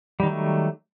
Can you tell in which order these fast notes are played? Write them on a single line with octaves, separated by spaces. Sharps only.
G3 D#3 F#3 A3